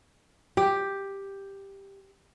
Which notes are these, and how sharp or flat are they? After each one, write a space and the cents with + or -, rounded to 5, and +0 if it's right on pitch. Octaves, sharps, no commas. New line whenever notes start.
G4 +5